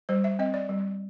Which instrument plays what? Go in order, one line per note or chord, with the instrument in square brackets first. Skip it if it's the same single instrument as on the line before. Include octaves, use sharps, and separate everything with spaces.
[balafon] G3 C5
E5
C4 D#5
D5
G3